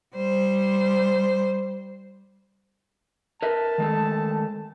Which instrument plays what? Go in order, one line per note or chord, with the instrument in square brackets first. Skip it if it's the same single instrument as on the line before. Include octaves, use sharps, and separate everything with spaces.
[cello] G3 C5
[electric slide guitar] A#4 B4 E5 [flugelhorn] A5
[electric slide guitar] D#3 G#3 A3